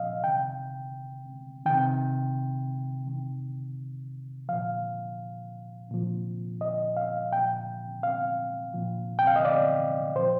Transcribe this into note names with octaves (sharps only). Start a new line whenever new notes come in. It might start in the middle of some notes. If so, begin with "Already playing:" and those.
Already playing: A#2 F3 D#5 F5
C3 D#3 G5
C3 D#3 G5
C3 D#3
A#2 F3 F5
A#2 F3
D#5
F5
A#2 F3 G5
F5
A#2 F3
G5
F5
D#5
D5
A#2 F3 C5